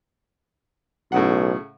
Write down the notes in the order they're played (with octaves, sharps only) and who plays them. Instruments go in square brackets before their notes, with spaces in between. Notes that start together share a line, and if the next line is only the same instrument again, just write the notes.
[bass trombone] B1 [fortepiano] A2 C#3 F#5